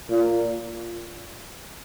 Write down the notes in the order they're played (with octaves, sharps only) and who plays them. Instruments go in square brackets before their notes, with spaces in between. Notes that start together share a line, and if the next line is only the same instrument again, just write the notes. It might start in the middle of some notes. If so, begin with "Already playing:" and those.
[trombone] A#2